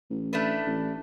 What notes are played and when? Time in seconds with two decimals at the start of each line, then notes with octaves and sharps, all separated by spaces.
0.10 A1
0.33 A3 D4 B4
0.67 A1